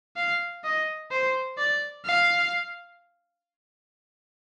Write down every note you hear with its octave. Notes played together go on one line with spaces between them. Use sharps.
F5
D#5
C5
D5
F5